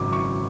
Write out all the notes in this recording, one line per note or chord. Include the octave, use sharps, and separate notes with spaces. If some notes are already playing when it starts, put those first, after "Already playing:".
Already playing: G#1 F#2 C#3 F#3 D6
C#6